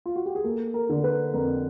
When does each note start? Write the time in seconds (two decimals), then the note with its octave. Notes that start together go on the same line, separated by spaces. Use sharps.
0.06 F4
0.16 F#4
0.26 G4
0.35 G#4
0.44 A#3 A4
0.74 A#4
0.89 D3
1.04 B4
1.34 F2 A#4